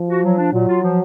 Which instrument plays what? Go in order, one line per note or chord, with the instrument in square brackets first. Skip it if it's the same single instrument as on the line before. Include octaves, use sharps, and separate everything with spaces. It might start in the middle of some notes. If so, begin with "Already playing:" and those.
Already playing: [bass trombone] F3
[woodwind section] F#4
F#3
D4
[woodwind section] A#2 [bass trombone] F#3
[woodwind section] F4
F3